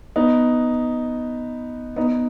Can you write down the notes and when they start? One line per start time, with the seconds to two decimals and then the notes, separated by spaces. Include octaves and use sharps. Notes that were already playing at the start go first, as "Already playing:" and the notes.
0.16 B3 D#4
1.96 B3 D#4